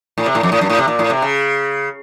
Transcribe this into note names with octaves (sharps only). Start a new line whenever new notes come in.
A2
C3
A2
F2
A2
F#2
A2
C3
A#2
A2
C3
C#3